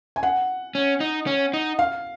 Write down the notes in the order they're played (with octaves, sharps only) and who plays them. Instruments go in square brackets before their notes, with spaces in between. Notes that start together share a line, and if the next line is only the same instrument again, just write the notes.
[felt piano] G#5
F#5
[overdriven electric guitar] C#4
D#4
C#4
D#4
[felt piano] F5